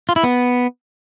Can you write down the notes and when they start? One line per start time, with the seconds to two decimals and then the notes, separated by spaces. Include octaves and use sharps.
0.09 F4
0.16 E4
0.23 B3